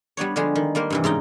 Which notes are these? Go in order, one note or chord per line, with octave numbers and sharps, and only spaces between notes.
G3 B3 D4 C#5
D3 F3 G3 G#3 G#4
D#3
G3 A#3 A#4 C5
G2 C3 E3
G#2 C#3 D#4 G5